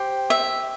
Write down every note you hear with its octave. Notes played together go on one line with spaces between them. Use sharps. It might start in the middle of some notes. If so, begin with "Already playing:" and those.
Already playing: G4 C5
E5